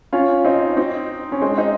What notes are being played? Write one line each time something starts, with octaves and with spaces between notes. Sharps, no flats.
C#4 F4
C4 D#4
C4 D#4
C#4
G#3 C4
C4 D#4